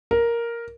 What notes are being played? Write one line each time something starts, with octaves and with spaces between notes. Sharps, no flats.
A#4